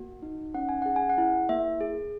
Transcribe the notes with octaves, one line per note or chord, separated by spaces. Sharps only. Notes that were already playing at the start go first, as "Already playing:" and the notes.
Already playing: A#3 F#4
D#4
C#4 F#5
G#5
G#4 F#5
G#5
F#5
E4
A#3 E5
G#4